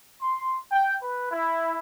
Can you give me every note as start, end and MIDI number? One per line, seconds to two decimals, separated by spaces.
0.21 0.58 84
0.72 0.95 79
1.01 1.30 71
1.32 1.79 64